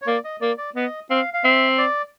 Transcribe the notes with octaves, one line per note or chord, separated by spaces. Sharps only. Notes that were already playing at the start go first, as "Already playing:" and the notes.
C#5
A#3 D5
D#5
A#3 D5
D5
B3 D#5
C4 F5
F5
C4 E5
D5